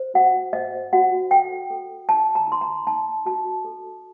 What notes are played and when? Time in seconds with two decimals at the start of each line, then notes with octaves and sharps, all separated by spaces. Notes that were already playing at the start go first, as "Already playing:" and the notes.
Already playing: C5
0.14 F#4 F#5
0.53 C5 D#5
0.93 F#4 F#5
1.31 A4 G5
1.71 A4
2.09 D#4 A5
2.35 A#5
2.48 D#4 C6
2.61 A#5
2.87 D#4 A5
3.26 F#4 A5
3.65 A4